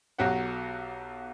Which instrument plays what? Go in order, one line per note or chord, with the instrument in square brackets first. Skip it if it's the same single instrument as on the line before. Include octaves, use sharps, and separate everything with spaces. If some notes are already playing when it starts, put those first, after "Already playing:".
[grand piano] B1 F#3 F#4 G4 F#5